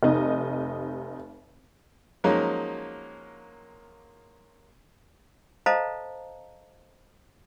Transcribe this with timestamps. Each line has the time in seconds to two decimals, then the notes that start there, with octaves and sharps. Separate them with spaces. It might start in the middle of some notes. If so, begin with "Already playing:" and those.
0.03 F1 C3 D#4 D#5
2.24 F3 F#3 G#3 A#3 C#4 D#4
5.66 A4 C5 D#5 F5 A5 A#5